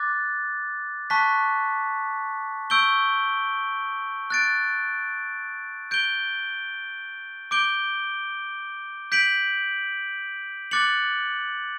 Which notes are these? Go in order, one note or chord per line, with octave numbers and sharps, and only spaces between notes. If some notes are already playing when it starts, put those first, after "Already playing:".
Already playing: D6 F#6 A6
A5 C#6 F#6 B6
C#6 E6 G6 D7 G7
F#6 A6 D7
G6 D7 G7
D6 G6 D7 G7
G6 B6 D7 F#7
D6 F#6 A6 C#7 F#7